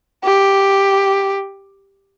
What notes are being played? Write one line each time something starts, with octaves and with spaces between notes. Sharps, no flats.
G4